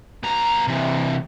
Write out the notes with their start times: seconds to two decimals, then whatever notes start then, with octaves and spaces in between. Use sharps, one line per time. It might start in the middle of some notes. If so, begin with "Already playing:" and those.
0.23 B3 A#5
0.68 C3 E3